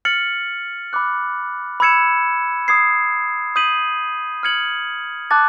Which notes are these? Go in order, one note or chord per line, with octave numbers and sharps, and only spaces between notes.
F6 A6 C#7 F#7
B5 D6 F#6
B5 E6 G#6 C#7 E7
D#6 G#6 C7
D#6 G6 B6 D#7 F#7
F6 G#6 C#7 F#7
A5 D6 F#6 A6